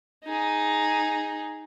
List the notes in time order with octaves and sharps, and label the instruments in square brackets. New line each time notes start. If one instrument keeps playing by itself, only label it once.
[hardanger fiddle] D#4 G#4